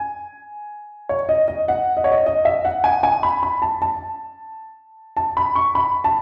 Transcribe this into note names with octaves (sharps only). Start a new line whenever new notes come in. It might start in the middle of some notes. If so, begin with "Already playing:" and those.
Already playing: G#5
C#5
D#5
D#5
F#5
D#5
C#5
D#5
D#5
E5
F#5
G#5
G#5
B5
B5
A5
A5
A5
B5
C#6
B5
A5